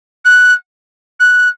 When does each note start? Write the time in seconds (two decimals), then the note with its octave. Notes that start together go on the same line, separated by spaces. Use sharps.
0.25 F#6
1.20 F#6